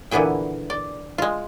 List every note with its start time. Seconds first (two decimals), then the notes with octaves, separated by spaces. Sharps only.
0.11 A#2 D3 E3 B3 G#4 G5
0.70 D5
1.18 G#3 F4